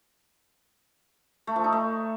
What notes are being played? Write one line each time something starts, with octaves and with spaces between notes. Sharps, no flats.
A3
F3
D#4
A3